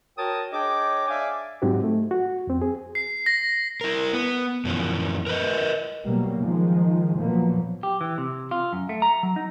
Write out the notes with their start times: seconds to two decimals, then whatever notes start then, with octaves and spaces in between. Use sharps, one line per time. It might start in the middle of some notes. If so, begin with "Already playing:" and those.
0.18 F#4 A#4 C#5 G5 A5 D#6
0.53 D4 G#4 C#5 D#5 G5 D6
1.09 D5 E5 F5 G#5 D6
1.62 G#2 F#3 C4 D#4 F#4 G4
1.84 A3
2.11 F#4
2.47 F2 C4
2.62 G#4
2.95 C7
3.26 A#6
3.81 E4 A#4
4.13 B3
4.65 F#2 B2 E3 F3
5.27 A#4 B4 D#5
6.05 B2 F#3 G3 A#3 B3
6.42 D#3 F3 G#3
7.19 A#2 F3 F#3 A#3 B3
7.83 G4
8.01 E3
8.18 C3
8.51 F4
8.73 F#2
8.89 A3
9.02 A#5
9.23 F#3
9.36 D#4